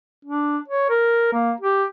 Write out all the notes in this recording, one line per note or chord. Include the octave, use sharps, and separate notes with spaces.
D4
C#5
A#4
A#3
G4